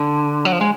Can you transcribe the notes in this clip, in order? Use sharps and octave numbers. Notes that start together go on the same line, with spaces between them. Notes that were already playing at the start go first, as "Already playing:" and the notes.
Already playing: D3
F#3
F3
G#3